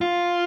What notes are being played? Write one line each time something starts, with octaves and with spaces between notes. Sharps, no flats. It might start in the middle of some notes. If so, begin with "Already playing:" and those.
F4